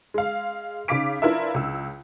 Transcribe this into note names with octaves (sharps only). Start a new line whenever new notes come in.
G#3 F5
C#3 D#4 F5 D6 B6 D7
D4 E4 F4 A#4 B4 E5
C#2 E6